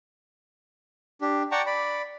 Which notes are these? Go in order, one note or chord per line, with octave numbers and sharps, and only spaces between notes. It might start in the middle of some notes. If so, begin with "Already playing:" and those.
D4 G4
D5 F#5 G5 A5 A#5 C#6
D5 B5